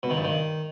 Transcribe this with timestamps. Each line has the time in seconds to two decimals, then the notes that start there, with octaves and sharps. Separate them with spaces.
0.03 B2
0.10 D#3
0.17 G2
0.24 D#3